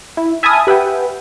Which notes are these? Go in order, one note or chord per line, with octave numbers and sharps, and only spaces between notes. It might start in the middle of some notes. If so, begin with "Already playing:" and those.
E4
E5 G#5 A5 B5 D#6 F6
G4 B4 E5 F#5 G5